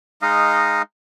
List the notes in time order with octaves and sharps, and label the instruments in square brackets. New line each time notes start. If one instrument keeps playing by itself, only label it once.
[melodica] G#3 D#4 D#5 F5